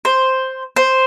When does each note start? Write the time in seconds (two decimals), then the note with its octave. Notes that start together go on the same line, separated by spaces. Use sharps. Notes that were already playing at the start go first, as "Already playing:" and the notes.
0.05 C5
0.76 C5